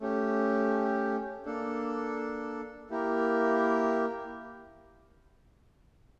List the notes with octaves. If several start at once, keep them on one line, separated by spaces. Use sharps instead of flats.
A3 C#4 G4
A#3 D4 A4
A#3 E4 G4 A#4